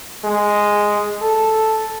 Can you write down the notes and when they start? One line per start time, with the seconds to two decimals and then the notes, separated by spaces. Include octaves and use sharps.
0.24 G#3
1.21 A4